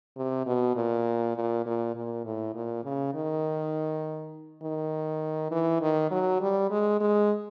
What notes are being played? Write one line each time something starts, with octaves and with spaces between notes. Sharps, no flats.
C3
B2
A#2
A#2
A#2
A#2
A2
A#2
C#3
D#3
D#3
E3
D#3
F#3
G3
G#3
G#3